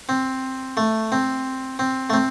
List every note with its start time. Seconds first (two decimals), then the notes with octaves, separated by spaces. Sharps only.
0.09 C4
0.77 A3
1.12 C4
1.79 C4
2.10 A3
2.13 C4